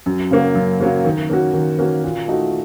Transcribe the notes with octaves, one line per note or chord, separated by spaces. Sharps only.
F#2
C#3 F#3 A#3
F#2
C#3 F#3 A#3
D#3
A#3 C#4 F#4
D#3
A#3 C#4 F#4
A#2
A3 D#4 F#4